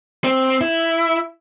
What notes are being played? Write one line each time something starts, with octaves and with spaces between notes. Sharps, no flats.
C4
E4